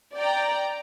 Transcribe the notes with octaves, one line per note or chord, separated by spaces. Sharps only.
D5 G5 A#5